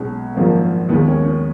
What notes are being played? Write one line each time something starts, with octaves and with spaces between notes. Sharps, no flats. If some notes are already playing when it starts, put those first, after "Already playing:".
Already playing: B1 B2 G#3 C#4
G#1 F#2 F3 A#3
D#2 D#3 G#3 B3
C#4
C#4